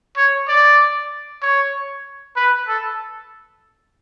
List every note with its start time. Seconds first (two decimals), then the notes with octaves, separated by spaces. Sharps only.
0.17 C#5
0.48 D5
1.42 C#5
2.36 B4
2.68 A4